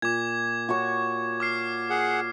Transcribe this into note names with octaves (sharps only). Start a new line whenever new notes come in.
A#2 D6 G#6
F#4 C#5 C#6
D6 F6 C7
G#4 F#5